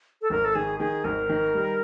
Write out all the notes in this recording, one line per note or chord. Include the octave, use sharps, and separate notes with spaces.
A4
G#1 A#4
A4
D#3 G#4
D#3 G#4
G#1 A#4
D#3
G3